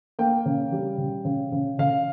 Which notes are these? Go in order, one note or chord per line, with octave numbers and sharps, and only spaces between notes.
A#3 G5
C#3
G3
C#3
C#3
C#3
C#3 F5